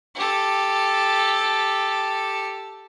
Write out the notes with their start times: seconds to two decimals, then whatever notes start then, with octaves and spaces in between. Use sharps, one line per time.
0.15 G4 A4